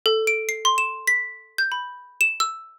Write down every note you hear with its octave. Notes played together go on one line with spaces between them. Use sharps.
A4
D7
C7
C6
E7
B6
G6
B5
E7
E6